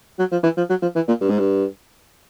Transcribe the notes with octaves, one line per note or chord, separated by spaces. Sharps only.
F#3
F3
E3
F3
F#3
F3
E3
A#2
G2
G#2
G2